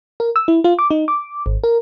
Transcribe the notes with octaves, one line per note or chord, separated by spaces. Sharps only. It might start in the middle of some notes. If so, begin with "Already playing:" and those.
A#4
E6
E4
F4
D6
D#4
D6
G#1
A#4